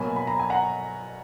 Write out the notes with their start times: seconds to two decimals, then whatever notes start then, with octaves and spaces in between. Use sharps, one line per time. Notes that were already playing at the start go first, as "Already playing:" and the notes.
Already playing: B2 F#3 A#3 G#5 B5
0.16 B5
0.27 A#5
0.39 G#5
0.50 F#5 A#5